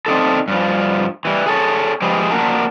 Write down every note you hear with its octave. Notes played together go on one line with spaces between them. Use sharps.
C4 D4 D#4 A4
G2 F3
E3 G3
G#4 A4 C#5
F3 G#3 G4 G#4 B4
A#3 D4 F#4 A#4 A5